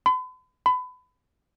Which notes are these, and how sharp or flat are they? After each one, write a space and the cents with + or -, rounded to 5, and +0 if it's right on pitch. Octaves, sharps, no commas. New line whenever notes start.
B5 +45
B5 +30